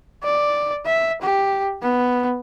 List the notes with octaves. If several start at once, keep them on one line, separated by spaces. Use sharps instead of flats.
D5
E5
G4
B3